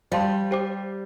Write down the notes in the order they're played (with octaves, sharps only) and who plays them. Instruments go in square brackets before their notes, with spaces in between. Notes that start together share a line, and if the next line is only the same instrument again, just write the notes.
[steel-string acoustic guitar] G3 [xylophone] C5 F5 A5 C6
[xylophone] G4 C5 G5 D6